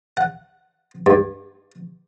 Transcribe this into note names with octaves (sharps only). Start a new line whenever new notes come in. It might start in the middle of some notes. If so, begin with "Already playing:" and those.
F#5
G2